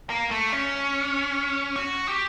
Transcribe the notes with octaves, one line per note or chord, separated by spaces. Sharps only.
A#3
A3
C#4
F#4
G4